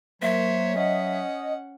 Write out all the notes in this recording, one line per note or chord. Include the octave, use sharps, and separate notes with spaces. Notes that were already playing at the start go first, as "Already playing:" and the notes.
F#3 A#3 C5 C#5 E5
C#4 D#5 F#5